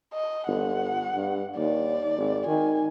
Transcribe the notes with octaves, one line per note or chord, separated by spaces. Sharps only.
D#5
G1 F#5
G2
D#2 D5
G#1
D#3 G#5